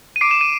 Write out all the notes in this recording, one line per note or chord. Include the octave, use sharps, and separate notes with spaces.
D#7
D6 C7 D7
E7
D#7